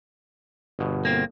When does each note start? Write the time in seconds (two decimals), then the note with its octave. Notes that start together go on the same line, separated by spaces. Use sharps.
0.79 G1 B2
1.05 A#3 C4